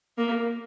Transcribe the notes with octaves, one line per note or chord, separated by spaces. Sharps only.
A#3